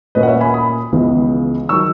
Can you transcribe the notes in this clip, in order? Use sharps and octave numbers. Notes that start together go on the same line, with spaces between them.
A#2 A#3 C#4 B4 D#5
F#5
C#5 E5
G#5 B5
B5 D#6
C#2 C#3 E3 B3
D#3 F#3 C#6 E6